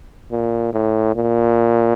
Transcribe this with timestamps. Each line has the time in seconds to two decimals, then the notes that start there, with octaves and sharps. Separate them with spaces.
0.32 A#2
0.73 A2
1.16 A#2